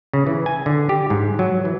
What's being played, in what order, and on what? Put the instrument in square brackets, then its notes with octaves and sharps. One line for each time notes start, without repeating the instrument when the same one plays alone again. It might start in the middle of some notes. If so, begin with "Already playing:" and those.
[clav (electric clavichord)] C#3
E3
G#5
D3
G4
G#2
F#3
E3